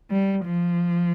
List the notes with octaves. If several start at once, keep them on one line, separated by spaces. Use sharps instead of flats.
G3
F3